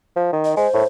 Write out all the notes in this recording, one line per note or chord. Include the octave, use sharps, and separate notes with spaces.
F3
D#3
D#5
G#3 C5
A2